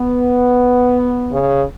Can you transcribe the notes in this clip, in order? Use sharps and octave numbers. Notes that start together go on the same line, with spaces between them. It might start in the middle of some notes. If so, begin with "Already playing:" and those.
Already playing: B3
C#3